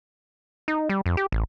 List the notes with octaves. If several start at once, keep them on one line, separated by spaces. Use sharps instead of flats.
D#4
G3
F2
G4
A1